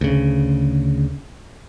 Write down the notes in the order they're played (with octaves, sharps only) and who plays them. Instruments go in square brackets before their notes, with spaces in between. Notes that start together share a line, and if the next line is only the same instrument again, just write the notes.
[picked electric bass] D2 C#3